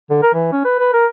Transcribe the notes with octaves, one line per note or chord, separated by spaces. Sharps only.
D3
A#4
E3
C#4
B4
B4
A#4